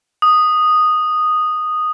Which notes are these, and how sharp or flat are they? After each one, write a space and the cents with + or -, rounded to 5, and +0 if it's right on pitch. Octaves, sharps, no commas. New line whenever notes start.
D#6 -5